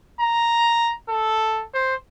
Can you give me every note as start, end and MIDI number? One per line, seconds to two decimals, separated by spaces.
0.20 0.93 82
1.09 1.63 69
1.74 1.95 72